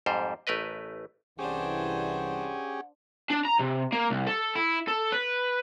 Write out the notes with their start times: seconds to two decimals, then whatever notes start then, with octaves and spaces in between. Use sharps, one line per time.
0.06 F2 G#2 G3 C5
0.47 A1 A3 A#4 B4 D#5
1.39 C2 E3 C#4 D4 G4 G#4 C5 F#5
3.30 D4
3.45 A#5
3.59 C3
3.92 A#3
4.10 C2
4.27 A4
4.55 E4
4.88 A4
5.12 B4